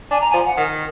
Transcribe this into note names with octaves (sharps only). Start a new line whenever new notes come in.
D4 G#5
A#5
G#5
F3
F#5
D#3